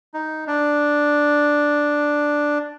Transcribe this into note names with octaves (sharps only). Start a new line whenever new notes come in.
D#4
D4